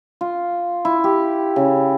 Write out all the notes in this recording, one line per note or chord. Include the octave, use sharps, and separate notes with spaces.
F4
E4
G4
C#3